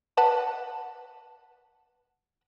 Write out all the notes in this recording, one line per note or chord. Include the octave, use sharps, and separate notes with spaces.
B4 F#5 A5